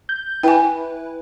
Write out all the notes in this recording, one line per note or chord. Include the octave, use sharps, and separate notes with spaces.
G6
E4 B4 G5 G#5